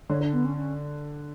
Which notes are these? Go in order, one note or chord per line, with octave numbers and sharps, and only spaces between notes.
D3 C#5
D4
B3
C#4
C#4